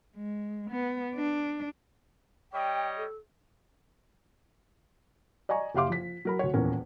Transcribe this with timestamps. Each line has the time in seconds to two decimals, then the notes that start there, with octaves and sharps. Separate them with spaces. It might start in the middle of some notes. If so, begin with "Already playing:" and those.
0.17 G#3
0.70 B3
1.15 D4
2.53 G3 C#5 D#5 G5
2.97 A4
5.49 D5 D#5 G#5 A#5 C#6
5.75 F#1 G4 E5 F5 C6 D6
5.90 F3 B6
6.25 F#3 A#4 B5
6.39 D2 C#5
6.53 D#1 E2 C#4 A#4